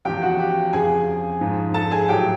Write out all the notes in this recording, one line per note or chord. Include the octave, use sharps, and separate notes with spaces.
E2 C#3 F3 G4 G5
F#4 F#5
G4 G5
F2 C#3 F3 G#4 G#5
G#2 F3
A4 A5
G#4 G#5
A2 F#3 G4 G5